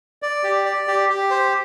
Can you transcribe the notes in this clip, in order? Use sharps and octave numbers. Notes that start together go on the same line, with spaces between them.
D5
G4
D5
G4
G4
C5